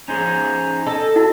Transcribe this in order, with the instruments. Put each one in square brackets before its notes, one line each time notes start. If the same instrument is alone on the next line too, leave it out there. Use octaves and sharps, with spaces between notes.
[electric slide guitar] C#4 D#4 G#4 [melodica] C5 G#5 A#5
[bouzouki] A4 [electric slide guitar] D#5
[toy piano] D#4 E4 F#4